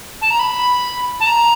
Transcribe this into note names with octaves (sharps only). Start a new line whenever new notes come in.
A5
A#5
B5
A5
A#5